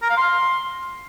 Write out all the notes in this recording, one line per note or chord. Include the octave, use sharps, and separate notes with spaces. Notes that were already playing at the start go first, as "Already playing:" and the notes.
A#4
F5
C6